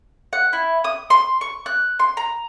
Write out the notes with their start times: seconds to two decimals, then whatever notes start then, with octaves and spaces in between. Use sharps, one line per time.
0.33 F#5
0.53 E4
0.84 D#6
1.10 C6
1.41 C#6
1.66 F#6
1.99 C6
2.17 A#5